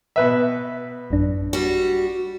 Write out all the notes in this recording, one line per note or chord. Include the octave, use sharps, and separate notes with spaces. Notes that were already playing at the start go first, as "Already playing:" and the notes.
B2 B4 E5
A1 F#2 D4
G3 F#4